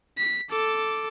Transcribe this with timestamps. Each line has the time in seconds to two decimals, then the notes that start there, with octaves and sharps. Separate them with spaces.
0.18 B6
0.50 A4 D6